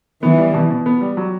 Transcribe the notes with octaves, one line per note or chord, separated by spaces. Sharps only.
E3 B3
G3
B2
B2
B3
G3
F#3